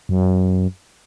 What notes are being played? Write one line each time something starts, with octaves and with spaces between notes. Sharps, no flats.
F#2